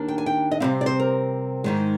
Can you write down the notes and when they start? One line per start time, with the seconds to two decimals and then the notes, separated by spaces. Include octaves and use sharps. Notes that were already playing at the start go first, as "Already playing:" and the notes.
Already playing: D#2 D#3 A#3 D4
0.08 G5
0.18 G#5
0.26 G5
0.51 D#5
0.60 C3 G3 C4 F5
0.81 D5
0.86 C5
0.99 A#4
1.64 G#2 D#3 G#3